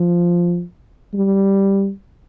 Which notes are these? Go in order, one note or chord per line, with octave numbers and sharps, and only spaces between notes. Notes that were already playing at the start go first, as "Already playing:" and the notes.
Already playing: F3
G3